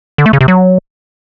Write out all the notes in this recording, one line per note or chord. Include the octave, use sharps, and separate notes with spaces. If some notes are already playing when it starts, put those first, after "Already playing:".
D3
A3
C#3
C3
F#3